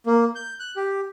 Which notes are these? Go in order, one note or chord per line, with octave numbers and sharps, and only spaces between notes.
A#3
G6
F#6
G4